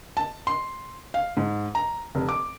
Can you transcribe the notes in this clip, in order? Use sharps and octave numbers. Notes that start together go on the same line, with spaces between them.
A5
C6
F5
G#2
A#5
F1
D6